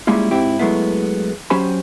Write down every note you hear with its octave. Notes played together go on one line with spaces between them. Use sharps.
G3 G#3 A#3 C#4 E4 F4
G#2 C4 E4 G4
F#3 G#3 A3 B3 E4
F#3 C#4 G4 C5 G#5 B5